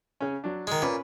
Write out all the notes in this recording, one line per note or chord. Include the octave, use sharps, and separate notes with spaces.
C#3 C#4
F#3 D4
D#3 G#3
A#2 C#4 B4